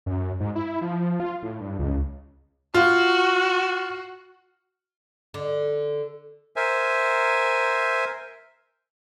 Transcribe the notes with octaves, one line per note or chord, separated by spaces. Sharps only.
F#2
G#2
E4
F3
F4
A2
G2
C#2
F4 F#4
D3
A#4 C5 E5 G#5